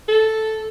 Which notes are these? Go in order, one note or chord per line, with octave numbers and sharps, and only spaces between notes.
A4